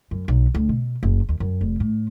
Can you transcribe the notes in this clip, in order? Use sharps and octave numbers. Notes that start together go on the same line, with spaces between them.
F#2
B1
D2
B2
F#1
D#2
F#2
F1
A2